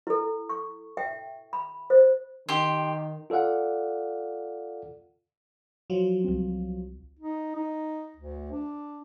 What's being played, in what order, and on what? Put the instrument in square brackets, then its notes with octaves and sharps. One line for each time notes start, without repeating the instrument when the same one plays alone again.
[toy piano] E4 A4
C#6
E5 G5
B5
C5
[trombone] D#3 [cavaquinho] G4 C6
[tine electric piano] F4 A4 D5 F5 F#5
[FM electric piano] F3 F#3 F4
[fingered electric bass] C2 C4
[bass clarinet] D#4
D#4
D2
D4